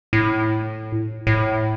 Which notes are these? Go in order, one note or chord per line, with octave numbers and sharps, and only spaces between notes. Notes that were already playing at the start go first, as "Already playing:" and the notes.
A2
A2